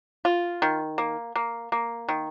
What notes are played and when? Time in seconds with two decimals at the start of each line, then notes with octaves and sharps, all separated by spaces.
0.25 F4
0.62 D#3
0.98 A#3
1.36 A#3
1.72 A#3
2.09 D#3